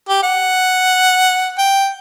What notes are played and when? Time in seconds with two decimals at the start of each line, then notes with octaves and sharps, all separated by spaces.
0.09 G4
0.23 F#5
1.58 G5